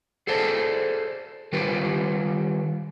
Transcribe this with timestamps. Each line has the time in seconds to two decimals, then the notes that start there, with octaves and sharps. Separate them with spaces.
0.27 G#4 A4 C5 D5 A5
1.53 D#3 G3 F4 G4 B4